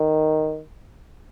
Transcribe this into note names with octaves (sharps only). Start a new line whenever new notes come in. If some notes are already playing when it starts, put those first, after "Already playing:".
Already playing: D#3